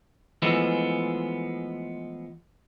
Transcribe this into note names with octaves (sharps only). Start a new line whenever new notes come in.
E3 F3 G#3 A3 B3